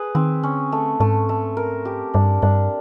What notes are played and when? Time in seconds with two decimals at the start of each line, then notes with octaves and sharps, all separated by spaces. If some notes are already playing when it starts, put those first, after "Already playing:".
Already playing: G#4 B4
0.15 D#3 C4
0.43 D3 C#4
0.72 A3
1.00 G#2 A3
1.29 A3
1.57 A#4
1.85 G4
2.14 G2 D4
2.42 G2 D4